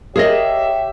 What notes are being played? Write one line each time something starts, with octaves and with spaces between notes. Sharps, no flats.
G4 G#4 A#4 C#5 D#5 E5